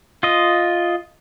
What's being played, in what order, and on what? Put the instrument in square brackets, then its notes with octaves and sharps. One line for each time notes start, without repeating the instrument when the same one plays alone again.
[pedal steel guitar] F4 D#5